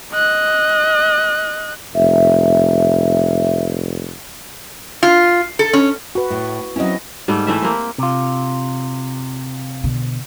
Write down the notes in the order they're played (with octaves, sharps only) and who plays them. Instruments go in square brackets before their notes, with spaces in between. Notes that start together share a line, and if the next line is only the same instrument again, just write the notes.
[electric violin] D#5 F#6
[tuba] F1 [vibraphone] E5
[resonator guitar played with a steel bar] F4
A4
C#4
[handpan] F#4 B4
[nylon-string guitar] A2
[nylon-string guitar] F#3 C4 C#4 [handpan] E4 D#5
[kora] G#2 G3 A3
E3 A3 E5
A#3 C4
[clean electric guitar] C3 F4
[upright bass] B2 D3